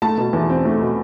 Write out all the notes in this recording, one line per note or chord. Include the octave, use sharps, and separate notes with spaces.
A3 A5
B2
E2
C4
A3
B2